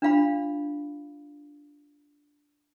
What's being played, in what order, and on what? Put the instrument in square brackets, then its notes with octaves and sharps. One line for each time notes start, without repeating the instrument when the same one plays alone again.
[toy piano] D4 F4 F5 B5